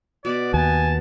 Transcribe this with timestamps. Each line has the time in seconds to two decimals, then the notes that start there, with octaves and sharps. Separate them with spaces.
0.25 B2 D5 B5
0.54 D#2 G#5 A5